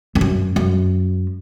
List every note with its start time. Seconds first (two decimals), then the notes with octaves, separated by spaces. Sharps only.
0.15 F2
0.21 F#2
0.56 F#2